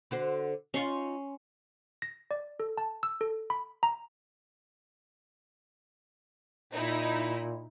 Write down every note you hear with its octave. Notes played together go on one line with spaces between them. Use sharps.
D3 F#4 C5
C#4 D#4 F4 C6 C#6
A#6
D5
A4
A5
E6
A4
B5
A#5
A#2 D#4 E4